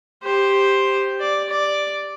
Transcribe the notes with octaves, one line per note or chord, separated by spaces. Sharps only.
G4 C5
D5
D5